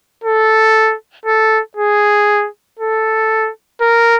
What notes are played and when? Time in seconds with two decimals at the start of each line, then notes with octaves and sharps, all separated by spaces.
0.24 A4
1.26 A4
1.77 G#4
2.79 A4
3.81 A#4